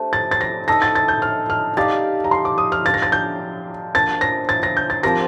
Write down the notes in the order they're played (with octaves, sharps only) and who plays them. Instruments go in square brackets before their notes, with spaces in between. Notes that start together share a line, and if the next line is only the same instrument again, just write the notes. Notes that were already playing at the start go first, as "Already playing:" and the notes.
Already playing: [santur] A3 D4 G4 C5
[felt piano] A6
A6
A#6
[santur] D#4 A4 D#5 [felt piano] A#6
[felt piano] A6
A6
G6
F6
F6
[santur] D#4 G4 D5 F5 [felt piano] A6
[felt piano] A#5
C6
D6
D#6
F6
[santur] D4 A4 D5 F5 [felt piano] A6
[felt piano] A#6
A6
G6
[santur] F3 A#3 D4 F4 [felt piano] A6
[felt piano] A#6
A6
A#6
G6
A6
[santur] F3 C4 G4 A#4 [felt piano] A#6